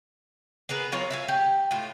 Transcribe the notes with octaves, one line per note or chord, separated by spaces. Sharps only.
B3 G#4 A#4 B4
F#3 F4 A#4 C#5
E5 F5 G#5
G4
A2 F4